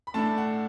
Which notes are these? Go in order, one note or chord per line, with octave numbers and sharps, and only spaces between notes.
B5
A2 A3 D4 A5
F#5